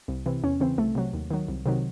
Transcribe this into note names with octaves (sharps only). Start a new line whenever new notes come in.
C2
C3 E3
E2 C#4
C#3 E3 C4
C2 A3
C3 F#3
D#2
D#3 F#3
C2
C3 D#3 F#3